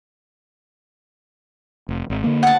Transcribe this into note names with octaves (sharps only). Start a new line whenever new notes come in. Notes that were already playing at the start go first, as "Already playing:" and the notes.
F1
G#1
D3 A#3
F#5 A5